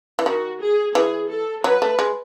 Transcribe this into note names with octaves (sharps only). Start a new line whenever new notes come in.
E3
D#3 F#4
G#4
E3 G#4
A4
F#3 B4
A3
G#3